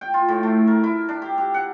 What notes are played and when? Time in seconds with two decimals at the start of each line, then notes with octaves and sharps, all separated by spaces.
0.01 G5
0.14 F4
0.29 A2
0.43 A3
0.67 A#4
0.84 E4
1.09 D4
1.22 G4
1.38 G4
1.54 F#5